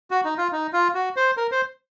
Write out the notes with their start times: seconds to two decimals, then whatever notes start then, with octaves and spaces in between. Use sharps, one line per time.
0.11 F#4
0.25 D#4
0.38 F4
0.52 D#4
0.73 F4
0.94 F#4
1.16 C5
1.37 A#4
1.52 C5